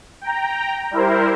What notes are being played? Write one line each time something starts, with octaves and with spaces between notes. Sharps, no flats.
G5 A#5
G3 E4 A#4 C5